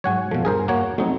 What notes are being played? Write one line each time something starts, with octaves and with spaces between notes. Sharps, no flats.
G#2 F#3 C#5 F#5 G#5
F#2 B2 F3 A4
E2 G2 G#4 A#4 C5
A#3 F#4 C#5
F#3 A3 C4 D#4